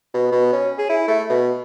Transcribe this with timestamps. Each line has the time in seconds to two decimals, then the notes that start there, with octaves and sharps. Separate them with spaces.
0.14 B2
0.31 B2
0.52 C#4
0.78 G#4
0.89 E4
1.08 A3
1.29 B2